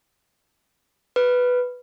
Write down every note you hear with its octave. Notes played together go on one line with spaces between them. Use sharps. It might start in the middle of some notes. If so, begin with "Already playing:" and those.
B4